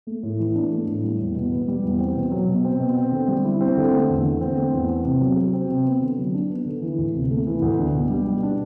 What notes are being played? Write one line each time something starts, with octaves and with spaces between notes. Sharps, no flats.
A3
A2
E3
D4
A3
A2
G3
E2
B2
B3
G3
E2
C4
B2
F#3
B2
C4
B2
C4
D3
G3
E4
C4
D3
A3
E2
D3
C4
A3
E2
C4
C3
F#3
F#4
C4
C3
B3
D3
F#3
D4
B3
D3
E3
D2
C3
A3
E3
D2
D4
B2
G3
B2
D4